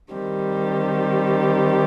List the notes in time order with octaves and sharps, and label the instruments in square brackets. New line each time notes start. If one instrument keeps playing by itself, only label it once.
[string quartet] D#3 G3 C4 G4